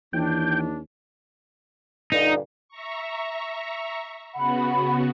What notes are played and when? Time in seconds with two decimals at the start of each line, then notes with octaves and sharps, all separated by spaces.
0.13 D#2 E3 D4 G5
2.12 G2 A#2 D3 D#4
2.69 E5 A#5 C#6
4.35 C#3 B3 F#4 F#5 B5